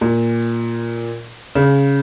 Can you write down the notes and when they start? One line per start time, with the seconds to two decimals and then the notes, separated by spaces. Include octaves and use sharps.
0.01 A#2
1.55 C#3